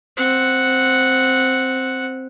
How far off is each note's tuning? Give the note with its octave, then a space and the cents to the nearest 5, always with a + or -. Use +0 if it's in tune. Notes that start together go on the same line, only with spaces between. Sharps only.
C4 +0 F#5 +0